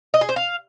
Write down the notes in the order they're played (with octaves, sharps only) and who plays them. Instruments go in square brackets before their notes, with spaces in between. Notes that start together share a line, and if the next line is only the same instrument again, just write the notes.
[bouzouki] D#5
G#4
C5
F5